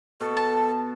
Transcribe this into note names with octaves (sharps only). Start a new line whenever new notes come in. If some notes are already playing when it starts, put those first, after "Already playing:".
B2 A4
A5